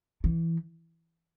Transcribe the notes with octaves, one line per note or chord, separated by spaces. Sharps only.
E3